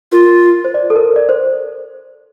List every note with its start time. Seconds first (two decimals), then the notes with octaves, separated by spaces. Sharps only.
0.12 F4 A#4
0.65 C5
0.74 D5
0.90 A4
0.96 A#4
1.16 D5
1.29 C5